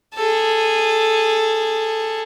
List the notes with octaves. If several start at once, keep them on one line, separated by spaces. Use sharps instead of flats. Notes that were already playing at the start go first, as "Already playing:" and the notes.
G#4 A4